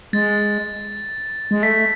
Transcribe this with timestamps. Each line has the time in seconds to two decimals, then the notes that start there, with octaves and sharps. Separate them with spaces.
0.13 G#3 A6
1.51 G#3
1.62 A3 B6